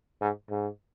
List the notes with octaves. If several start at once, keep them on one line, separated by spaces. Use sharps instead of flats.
G#2
G#2